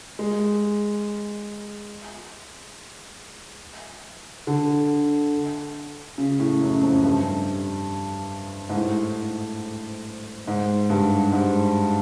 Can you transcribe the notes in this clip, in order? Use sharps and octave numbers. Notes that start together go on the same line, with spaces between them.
G#3
D3
C#3
A2
F#2
F2
G2
G#2
A2
G#2
G2
G#2